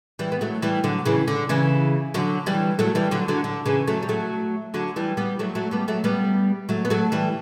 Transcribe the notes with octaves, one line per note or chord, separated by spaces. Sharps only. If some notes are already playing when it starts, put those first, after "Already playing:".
E3 G3
B3
F#3 A3
E3 G3
D3 F#3
C#3 E3
D3
C#3 E3
D3 F#3
E3 G3
F#3 A3
E3 G3
D3 F#3
D3 F#3
D3
C#3 E3
F#3 A3
G3
F#3 A3
D3 F#3
E3 G3
G3 B3
F#3 A3
F#3 A3
G3 B3
F#3 A3
G3 B3
F#3 A3
B3
F#3 A3
E3 G3